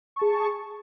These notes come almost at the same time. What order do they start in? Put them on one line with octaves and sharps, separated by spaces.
C#6 A5 G#4